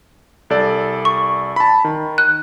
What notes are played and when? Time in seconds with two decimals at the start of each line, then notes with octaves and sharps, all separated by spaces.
0.50 C2 A4 D5
1.05 C#6
1.56 A5 B5
1.84 D#3
2.18 F#6